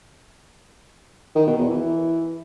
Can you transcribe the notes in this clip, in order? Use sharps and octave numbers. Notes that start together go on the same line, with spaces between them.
D#3
B2
E2
E3